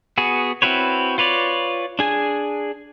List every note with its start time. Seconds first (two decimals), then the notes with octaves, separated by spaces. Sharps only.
0.18 B3 F#4 G#4
0.62 C4 E4 F#4 B4 C#5
1.18 F4 B4 C#5 D5
1.99 D4 G#4 G#5